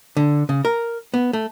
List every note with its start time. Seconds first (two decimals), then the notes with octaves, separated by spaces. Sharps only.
0.17 D3
0.49 C#3
0.65 A#4
1.14 B3
1.33 A3